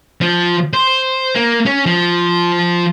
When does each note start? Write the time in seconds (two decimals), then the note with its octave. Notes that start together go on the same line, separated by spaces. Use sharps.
0.21 F3
0.73 C5
1.35 A#3
1.66 C#4
1.86 F3